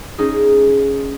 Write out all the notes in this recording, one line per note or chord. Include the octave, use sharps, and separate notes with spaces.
C#4 D#4 G#4